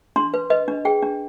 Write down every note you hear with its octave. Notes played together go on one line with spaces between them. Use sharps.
D4 C6
B4
B4 D#5
D4
G#4 G5
D4